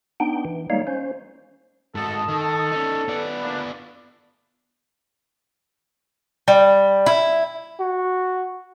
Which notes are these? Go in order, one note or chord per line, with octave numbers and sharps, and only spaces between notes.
B3 D4 D#4 G5
E3
G3 G#3 A#3 D#4 C#5 F5
C#4 C5
G#2 F#4 A4 D#5 A5 D#6
D#3 A4
C#4 D#4
B3 B4 D5
A3 A#3 D4
G3
E4
F#4